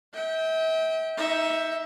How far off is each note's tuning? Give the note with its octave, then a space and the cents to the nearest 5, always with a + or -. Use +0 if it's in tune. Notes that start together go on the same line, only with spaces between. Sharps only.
E5 -40 G5 +0
D#4 +30 E5 +0